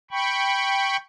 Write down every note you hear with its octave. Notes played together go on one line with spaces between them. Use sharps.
G5 B5 C#6